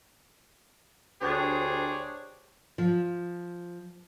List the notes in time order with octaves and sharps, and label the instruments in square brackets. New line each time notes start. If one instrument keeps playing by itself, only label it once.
[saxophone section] D2 D4 G4 G#4 C5 C#5
[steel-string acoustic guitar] F3